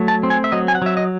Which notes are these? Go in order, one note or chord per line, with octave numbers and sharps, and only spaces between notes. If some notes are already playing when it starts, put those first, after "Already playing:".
Already playing: F#3 A3
A5
C4
G#5
E5
F#3 D#5
G#5
F#5
F#3 E5
D#5